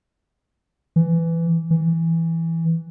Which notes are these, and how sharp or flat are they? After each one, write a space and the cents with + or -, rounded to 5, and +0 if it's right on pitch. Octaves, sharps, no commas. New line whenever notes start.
E3 +15
E3 +0